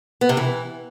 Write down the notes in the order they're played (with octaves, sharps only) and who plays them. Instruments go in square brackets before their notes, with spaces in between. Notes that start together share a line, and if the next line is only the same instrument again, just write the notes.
[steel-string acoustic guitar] B3
C3
E3